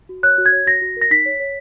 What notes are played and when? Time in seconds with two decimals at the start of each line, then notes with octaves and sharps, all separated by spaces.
0.09 F#4
0.23 C#5 F#6
0.38 F#4
0.46 G#6
0.52 C#5
0.66 F#4 A#6
0.81 F#4
0.97 A#4 A#6
1.11 D#4 B6
1.26 C#5
1.40 C#5